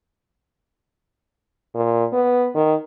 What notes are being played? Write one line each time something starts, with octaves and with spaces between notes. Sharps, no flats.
A#2
B3
D#3